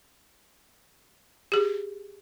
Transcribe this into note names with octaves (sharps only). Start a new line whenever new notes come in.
G4 G#4